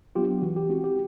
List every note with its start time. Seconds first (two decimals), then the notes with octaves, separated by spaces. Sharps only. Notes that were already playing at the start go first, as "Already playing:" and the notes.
0.15 F#3 B3 D4 F4 G4
0.42 E3 F#4
0.56 G4
0.68 G#3 C4 E4 F#4
0.84 G4